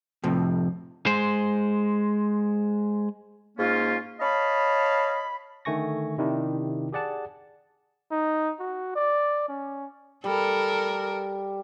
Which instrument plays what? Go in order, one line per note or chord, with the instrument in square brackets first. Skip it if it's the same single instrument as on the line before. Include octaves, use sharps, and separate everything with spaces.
[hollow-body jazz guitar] F2 A2 C3
[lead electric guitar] G#3 C5
[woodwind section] G#2 A#3 C#4 F4
C#5 D#5 F5 A5 B5
[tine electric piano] D3 D#3 A3 G#5 C#6 A#6
C3 D#3 D4 E4 G4
G4 G#4 D5 F#5 A5
[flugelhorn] D#4
F#4
D5
C#4
[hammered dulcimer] G3 [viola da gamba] A4 A#4